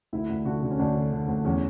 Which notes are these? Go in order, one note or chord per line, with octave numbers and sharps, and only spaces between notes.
D2 E4
D2
D3 F#4
D3
C#4
D2 D4
D3
D3
D2
E2 C#4